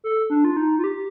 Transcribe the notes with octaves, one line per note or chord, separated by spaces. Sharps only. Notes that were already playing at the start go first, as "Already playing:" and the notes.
A4
D4
F4
D#4
F4
G4